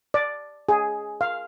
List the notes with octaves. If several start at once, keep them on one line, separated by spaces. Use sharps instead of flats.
D5
G#4
F5